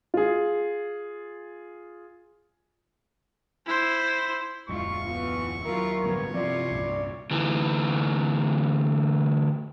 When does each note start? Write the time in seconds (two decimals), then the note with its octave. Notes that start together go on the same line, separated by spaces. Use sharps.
0.14 F4 G#4
3.67 E4 C5
4.69 D1 F2 G#3 E4 F4 C#6
5.06 E3 B3 F4
5.64 D#2 F#3 E4 F4 A#4
6.04 A1 D2 G2 F3 G3 B3 C#5
6.34 G1 C3 F3 C4 E4 F4 D5
6.71 C2 G2 A#2
7.31 D2 E3